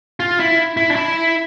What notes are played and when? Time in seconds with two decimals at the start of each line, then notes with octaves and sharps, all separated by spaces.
0.20 F4
0.40 E4
0.77 E4
0.91 D4
0.96 E4